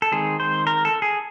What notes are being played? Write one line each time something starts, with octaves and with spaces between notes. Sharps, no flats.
A4
D#3 G#3 C4 G#4
C5
A#4
A4
G#4